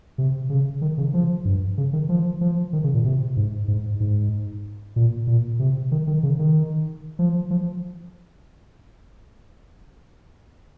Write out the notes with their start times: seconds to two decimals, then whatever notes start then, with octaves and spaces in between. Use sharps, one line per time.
0.18 C3
0.50 C#3
0.81 D#3
0.98 C#3
1.14 F3
1.45 G2
1.78 C#3
1.93 D#3
2.09 F3
2.41 F3
2.73 D#3
2.84 C#3
2.94 A#2
3.05 C3
3.37 G#2
3.68 G#2
4.00 G#2
4.96 A#2
5.27 A#2
5.59 C3
5.92 D#3
6.07 D#3
6.23 C#3
6.39 D#3
7.19 F3
7.51 F3